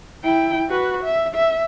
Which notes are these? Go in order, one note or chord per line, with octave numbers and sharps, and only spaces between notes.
E4 G5
F#4 B4
E5
E5